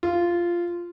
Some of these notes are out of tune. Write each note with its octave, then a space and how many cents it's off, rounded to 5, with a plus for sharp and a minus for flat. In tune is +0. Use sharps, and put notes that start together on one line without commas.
F4 -10